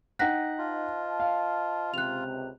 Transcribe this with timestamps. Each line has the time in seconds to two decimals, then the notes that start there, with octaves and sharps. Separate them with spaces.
0.19 D#4 F#5 G5 F#6 A#6 B6
0.59 F4 C5 D#5 A5
1.20 F5
1.94 C#2 C3 F#6 F7